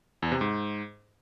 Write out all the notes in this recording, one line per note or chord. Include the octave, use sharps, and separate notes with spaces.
E2
C3
G#2